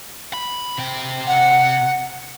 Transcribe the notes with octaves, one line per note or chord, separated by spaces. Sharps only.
B5
C3 G5
F#5